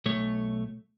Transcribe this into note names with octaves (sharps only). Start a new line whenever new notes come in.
B1 A3 C#5